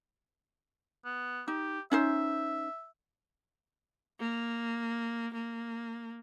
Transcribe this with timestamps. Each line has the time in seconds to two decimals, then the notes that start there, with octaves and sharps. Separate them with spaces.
1.05 B3
1.48 D#4 G4
1.92 C#4 D#4 C5 E5
4.20 A#3
5.33 A#3